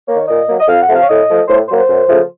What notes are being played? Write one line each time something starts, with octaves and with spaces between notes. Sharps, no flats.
D#3 A#3 C#5
A#2 D#5
F#3 A#3
D#5
F2 F5
F#5
C3 F3 A3
F5
C#5
A2 D#5
F3 A3
A2 C5
F#3 A#3 C5
C5
F#2
C#3 F3 A3